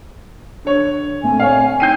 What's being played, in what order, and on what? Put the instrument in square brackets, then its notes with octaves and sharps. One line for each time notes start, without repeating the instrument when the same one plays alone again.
[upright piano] D3 C#5
[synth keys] A#2 A3 C4 [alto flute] G#5
[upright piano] C#5 F5
[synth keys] D#4 B6 [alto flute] G5 [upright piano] G6 C7 D#7